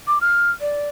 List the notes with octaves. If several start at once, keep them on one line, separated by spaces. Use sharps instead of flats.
D6
F6
D5